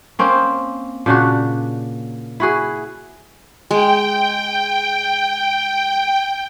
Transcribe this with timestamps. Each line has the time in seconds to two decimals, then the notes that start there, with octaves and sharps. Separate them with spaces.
0.19 A#3 C4 C#4
1.06 A#2 C#3 D4 F#4
2.40 E4 F#4 G#4
3.71 G#3 G5